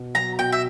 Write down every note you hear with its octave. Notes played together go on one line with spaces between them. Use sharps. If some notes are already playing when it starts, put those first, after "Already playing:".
Already playing: B2
F#3 A#5
B2 G5
E5